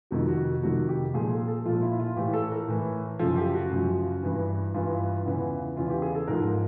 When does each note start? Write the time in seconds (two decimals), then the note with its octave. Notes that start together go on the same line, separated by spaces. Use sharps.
0.11 F2 C3 D#3 F#4
0.28 F#4
0.63 F2 C3 D#3 F#4
0.89 G4
1.14 A#2 F3 G#4
1.32 A4
1.48 A4
1.65 A#2 F3 F4
1.82 E4
1.99 F4
2.16 A2 E3 G4
2.33 A4
2.52 A#4
2.68 A2 E3
3.19 F#2 C#3 F3 A4
3.37 G4
3.54 F#4
3.71 F#2 C#3 F3
4.23 G2 E3
4.74 G2 E3 F4
5.25 E2 C#3 E3
5.76 E2 C#3 E3 F4
5.90 G4
6.02 G#4
6.15 A4
6.28 G#2 F3 A#4